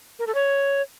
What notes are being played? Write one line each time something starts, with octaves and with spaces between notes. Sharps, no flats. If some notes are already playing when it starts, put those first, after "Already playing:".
A#4
A4
C#5